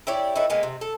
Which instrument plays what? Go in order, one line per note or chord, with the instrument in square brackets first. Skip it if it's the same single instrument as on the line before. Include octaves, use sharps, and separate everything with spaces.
[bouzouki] E4 G4 C#5 D5
E3 A3 D#4 E4
G#3 A#3 B3
C3
A4